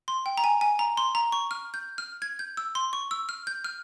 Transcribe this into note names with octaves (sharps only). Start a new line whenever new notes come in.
C6
G5
A#5
G#5
G#5
A#5
C6
A#5
C#6
F6
G6
F6
G#6
G6
E6
C6
C#6
E6
F6
G6
F6